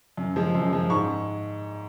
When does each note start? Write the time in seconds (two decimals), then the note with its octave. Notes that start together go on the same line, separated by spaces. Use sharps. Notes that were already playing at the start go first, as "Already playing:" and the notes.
0.17 F#2
0.36 F3 G#3
0.55 F#2
0.73 F3 G#3
0.90 G#2 C#6